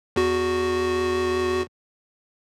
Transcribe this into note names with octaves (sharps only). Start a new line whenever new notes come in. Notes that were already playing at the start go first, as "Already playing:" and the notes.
E2 F#4